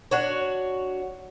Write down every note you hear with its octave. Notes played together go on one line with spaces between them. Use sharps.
D4 F#4 C#5